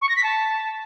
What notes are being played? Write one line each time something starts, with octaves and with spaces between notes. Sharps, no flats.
C#6
A#6
B6
A5